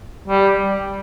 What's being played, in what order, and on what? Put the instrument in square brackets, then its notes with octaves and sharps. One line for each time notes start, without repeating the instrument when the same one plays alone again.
[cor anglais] G3